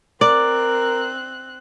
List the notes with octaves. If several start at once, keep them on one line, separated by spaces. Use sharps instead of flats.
C4 A#4 D5 F#6